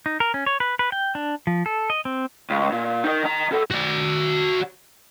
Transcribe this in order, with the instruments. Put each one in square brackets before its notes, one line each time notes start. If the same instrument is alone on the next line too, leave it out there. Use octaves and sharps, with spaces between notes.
[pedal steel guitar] D#4
A#4
C#4
C#5
B4
B4
G5
D4
F3
A4
D#5
C4
[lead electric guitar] C#2
A#2
D#4 A#4
D#3 A#5
B2 A4
[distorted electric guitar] F#4 D5